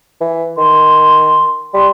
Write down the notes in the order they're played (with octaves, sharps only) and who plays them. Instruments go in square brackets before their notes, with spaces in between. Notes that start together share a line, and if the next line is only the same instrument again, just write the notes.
[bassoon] E3
[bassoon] D#3 [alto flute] C6
[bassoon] G3 [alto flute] C6